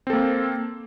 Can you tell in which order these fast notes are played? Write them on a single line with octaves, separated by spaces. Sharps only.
C4 A4 A#3